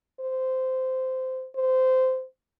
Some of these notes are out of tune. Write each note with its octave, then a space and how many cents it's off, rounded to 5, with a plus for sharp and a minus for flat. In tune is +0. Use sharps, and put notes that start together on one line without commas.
C5 -15
C5 -15